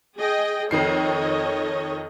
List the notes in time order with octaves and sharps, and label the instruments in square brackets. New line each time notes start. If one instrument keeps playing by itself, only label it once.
[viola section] G#4 D#5 G5
[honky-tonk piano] F2 D#3 C7 [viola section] A4 C#5 D#5